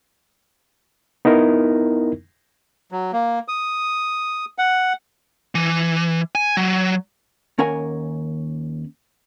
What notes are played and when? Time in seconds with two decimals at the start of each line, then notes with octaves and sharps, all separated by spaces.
1.25 B3 D#4 E4 A#4
2.92 F#3
3.13 A#3
3.48 D#6
4.58 F#5
5.55 E3
6.35 G#5
6.57 F#3
7.58 D#2 C#4 A#4 F#5 G#5